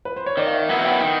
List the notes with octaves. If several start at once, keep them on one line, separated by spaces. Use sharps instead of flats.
B4
C5
C#5
D#3 D5
F5
E5
F#3 B3 E4 F#5
G5
D#3 G5